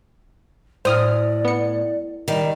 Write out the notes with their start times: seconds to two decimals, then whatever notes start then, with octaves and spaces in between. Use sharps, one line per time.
0.85 A2 C5 D5 D#6 F6
1.45 B3 C#7
2.28 D#3 G3 D#5